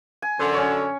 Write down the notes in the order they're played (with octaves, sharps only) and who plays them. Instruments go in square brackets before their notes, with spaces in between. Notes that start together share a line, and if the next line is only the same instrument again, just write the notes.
[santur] G#5
[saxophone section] F#2 D3 [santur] C5
[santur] C#4 C#5